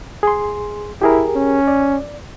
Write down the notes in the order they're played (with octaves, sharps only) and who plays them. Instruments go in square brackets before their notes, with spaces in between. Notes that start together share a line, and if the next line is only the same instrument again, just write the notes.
[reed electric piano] G#4 C6
[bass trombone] E4 [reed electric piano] G4 G#4 A#4
[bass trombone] C#4
[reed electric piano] D5